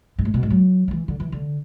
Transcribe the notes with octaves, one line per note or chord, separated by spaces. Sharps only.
G#2
A2
B2
G#2
F#3
F#3
E3
D3
E3
D3